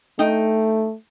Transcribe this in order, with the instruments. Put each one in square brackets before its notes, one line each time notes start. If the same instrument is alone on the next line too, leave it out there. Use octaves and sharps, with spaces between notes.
[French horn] A3 [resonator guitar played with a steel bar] D#4 G5